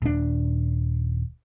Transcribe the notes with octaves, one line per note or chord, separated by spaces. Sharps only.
D#1 D4